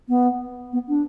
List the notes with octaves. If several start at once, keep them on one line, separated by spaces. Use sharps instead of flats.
B3
B3
D4